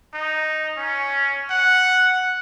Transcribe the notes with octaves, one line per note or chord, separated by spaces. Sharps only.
D#4
C#4
F#5